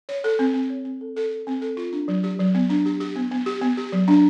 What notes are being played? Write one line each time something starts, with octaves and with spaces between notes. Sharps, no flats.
C#5
A4
C4
C4
C#5
C4
A4
A4
A4
C4
A4
F4
D4
F#3
G4
F#3
B3
D4
G4
G4
B3
B3
G4
B3
G4
F#3
D4